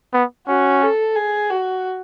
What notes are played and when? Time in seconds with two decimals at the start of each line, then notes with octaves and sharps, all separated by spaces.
0.13 B3
0.47 C#4 F#4
0.82 A4
1.16 G#4
1.50 F#4